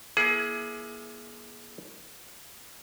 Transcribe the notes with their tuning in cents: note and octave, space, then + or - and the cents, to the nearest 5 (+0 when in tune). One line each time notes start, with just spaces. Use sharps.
A#3 +40 E4 +10 G#4 +25